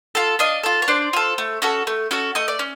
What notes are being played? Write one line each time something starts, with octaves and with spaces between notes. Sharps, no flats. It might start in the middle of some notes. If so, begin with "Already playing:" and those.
F4 A4
D4 D#5 F5
F4 A4
C#5
D4 C5 D5
F4 A4
A3
C#4 F#4 A4
A3
C#4 F#4 A4
A3 D#5
D5
C#4